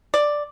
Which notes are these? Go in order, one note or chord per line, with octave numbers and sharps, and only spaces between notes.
D5